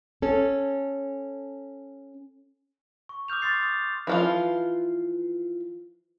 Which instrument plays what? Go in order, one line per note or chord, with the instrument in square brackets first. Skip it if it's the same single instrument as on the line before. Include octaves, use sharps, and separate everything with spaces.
[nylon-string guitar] C#4 A4
[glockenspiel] C#6
D6 D#6 F6 G6 F7
C6 D#6 A6 C7
D#6
[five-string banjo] E3 F3 F4